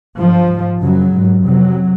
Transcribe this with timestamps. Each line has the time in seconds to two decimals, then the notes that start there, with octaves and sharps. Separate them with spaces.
0.19 G2 F3
0.51 G#2
0.82 F#2 C#3 F#3
1.13 G#2
1.44 F2 C3 F#3